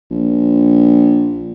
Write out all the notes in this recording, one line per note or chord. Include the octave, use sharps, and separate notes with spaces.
A#1